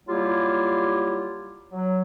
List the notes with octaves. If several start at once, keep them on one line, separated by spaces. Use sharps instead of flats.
F#3 G3 A#3 E4 F4 G4
F#3